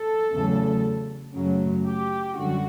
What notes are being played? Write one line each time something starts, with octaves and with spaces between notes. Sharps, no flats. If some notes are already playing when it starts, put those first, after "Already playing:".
Already playing: A4
E2 C#3 F#3 A3
F#2 C#3 F#3 A3
G4
F#2 D3 G3 F#4